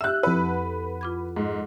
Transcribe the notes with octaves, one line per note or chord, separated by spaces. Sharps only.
G4 E5 E6 F#6
F2 E4 A4 B4 F#5
F4 D6 G#6
G#2